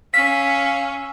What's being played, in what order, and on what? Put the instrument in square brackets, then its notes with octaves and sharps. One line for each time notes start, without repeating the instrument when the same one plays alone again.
[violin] C#4 [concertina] F5 E6 [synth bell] B6